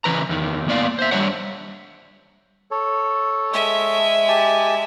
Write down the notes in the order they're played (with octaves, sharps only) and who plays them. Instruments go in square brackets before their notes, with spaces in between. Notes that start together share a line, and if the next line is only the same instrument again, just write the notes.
[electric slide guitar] C#3 E3 B4 A#5
E2 D#3
A#3 B3 D5 F5
C5 E5
G3 C4 D4 C#5 F#5
[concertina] A4 C#5
[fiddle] G#3 E5
[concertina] G4 G#5 A5